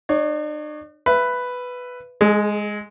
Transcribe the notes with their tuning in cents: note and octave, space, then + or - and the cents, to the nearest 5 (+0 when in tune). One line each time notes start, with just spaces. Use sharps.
D4 +45 C#5 +15
B4 +5 E5 +30
G#3 +0 G#4 +45